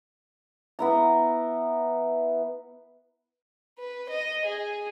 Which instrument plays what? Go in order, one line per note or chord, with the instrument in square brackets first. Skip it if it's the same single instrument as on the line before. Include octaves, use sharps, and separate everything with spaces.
[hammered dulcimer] B3 E4 A#5
[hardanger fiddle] B4
D#5
G#4